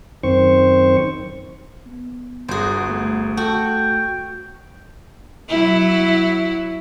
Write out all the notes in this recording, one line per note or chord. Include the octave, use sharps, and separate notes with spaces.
F#2 D#3 C4 C5 C#6
B3
G1 F#4 G#4 C5
A3
F#4 A4 G5
F#3 E4